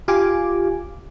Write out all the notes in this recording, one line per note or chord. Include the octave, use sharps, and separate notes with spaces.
F4 G4 F5 G#5 D6